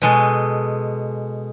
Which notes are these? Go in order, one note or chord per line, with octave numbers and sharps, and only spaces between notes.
B2 G#3 A4